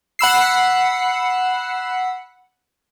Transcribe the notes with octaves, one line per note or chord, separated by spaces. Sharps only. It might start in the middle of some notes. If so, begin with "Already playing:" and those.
F#5 B5 E6 C7